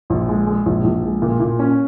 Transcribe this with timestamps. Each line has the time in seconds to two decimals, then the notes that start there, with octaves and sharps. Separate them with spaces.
0.10 A#1
0.29 G#3
0.47 G#3
0.66 A#1
0.84 A#1
1.03 G#3
1.22 A#2
1.40 A#2
1.59 C#4